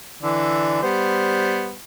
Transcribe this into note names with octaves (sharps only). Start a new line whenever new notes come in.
D3 E3 D5
G3 B3 C5